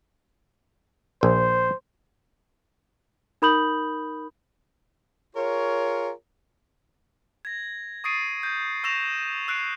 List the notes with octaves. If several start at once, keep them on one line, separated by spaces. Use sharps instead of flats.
A#1 C5
D#4 A#4 B5 D#6 G6 F#7
F4 G#4 A#4 C#5
G#6 A#6
C#6 D#6 A6 C7 D7 D#7
G6 G#6
C#6 E6 A#6 E7 F7
E6 F#6 C7 D7